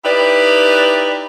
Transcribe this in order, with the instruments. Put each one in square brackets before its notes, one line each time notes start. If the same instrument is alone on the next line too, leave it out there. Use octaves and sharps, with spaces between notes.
[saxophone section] D#4 E4 G4 B4 D5